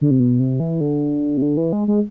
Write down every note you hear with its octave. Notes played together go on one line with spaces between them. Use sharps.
D3
C3
B2
C3
E3
D3
C3
D3
E3
G#3
G#3